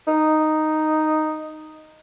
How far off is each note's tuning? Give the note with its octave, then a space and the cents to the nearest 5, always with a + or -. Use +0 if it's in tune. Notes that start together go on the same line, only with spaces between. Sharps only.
D#4 -5